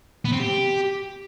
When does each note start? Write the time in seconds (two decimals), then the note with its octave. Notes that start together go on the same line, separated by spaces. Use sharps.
0.25 B3
0.32 C4
0.40 G4